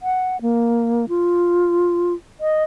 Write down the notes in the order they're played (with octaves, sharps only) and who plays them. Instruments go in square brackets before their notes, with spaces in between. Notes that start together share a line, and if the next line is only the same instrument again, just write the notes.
[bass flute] F#5
A#3
F4
D#5